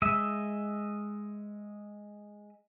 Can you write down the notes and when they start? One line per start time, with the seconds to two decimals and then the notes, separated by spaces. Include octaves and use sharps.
0.02 G#3 D#5 E5